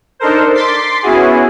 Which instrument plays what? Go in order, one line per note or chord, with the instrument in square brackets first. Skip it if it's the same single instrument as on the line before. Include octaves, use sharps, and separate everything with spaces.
[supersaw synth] D4 D#4 A4 A#4 C5
C6 D6 A6 B6 C7
B3 C#4 E4 F#4 G#4